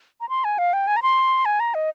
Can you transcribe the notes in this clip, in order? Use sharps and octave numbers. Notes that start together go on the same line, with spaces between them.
A#5
C6
G#5
F5
G5
G#5
A#5
C6
G#5
A#5
D#5